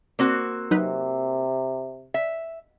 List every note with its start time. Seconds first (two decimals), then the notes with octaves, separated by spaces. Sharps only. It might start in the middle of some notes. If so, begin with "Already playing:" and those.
0.19 A#3 C4 F#4
0.71 C3 F#3 D#4 B4
2.14 E5